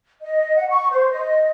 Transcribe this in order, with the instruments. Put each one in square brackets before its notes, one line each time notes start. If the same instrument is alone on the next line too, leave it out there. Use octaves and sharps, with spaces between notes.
[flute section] D#5
F#5
C#6
C5
D#5